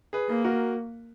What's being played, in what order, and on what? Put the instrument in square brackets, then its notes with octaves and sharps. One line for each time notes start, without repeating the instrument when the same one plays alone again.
[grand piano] G#4 B4
[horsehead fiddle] A#3
[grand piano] F#4 A#4